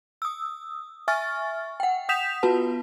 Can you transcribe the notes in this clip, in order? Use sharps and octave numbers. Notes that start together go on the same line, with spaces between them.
D#6 E6
E5 G#5 C#6 F6 A6
F#5 G5
F#5 D#6 G6 B6 E7 F7
B3 F4 F#4 B4 A5